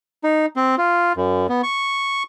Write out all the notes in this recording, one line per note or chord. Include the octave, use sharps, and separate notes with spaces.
D#4
C4
F4
F#2
B3
C#6